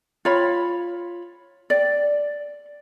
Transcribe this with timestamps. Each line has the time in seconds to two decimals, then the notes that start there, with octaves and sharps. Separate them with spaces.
0.25 F4 C#5 B5
1.70 D5